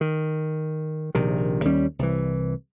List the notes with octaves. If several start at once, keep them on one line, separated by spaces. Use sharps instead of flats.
D#3
A#1 C3 D#3
D#2 G3 C#4
C2 E3